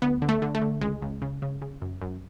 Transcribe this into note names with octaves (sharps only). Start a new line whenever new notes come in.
D2 B3
D3
A3
D3
A3
D3
C#2 G#3
C#2
C#3
C#3
C#3
F#2
F#2